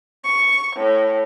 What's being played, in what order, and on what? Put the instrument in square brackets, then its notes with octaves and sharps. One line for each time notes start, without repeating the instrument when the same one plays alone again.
[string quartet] C#6
A2